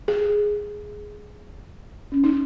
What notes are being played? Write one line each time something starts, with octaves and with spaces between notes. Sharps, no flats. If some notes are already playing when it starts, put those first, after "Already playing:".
G#4
C#4
D#4